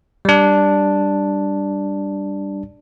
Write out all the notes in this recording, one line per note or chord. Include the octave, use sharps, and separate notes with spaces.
G3 D4